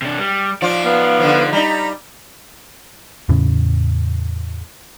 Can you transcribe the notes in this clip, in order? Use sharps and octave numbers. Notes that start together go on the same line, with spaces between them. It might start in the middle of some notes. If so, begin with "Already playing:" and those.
C3 D4
G3
F3 D#4 F4 D5
B3 F5
D3 F3
G3 D#4 A#5 B5
E2 A2 C#3 C#4